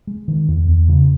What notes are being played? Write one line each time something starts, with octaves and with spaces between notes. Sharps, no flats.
G#3
D#3
E2
E2
C#3